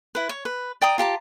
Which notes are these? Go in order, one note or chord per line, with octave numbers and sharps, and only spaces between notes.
E4 B4
C#5
B4
D5 G5 A#5 D#6
F4 G4 A5 A#5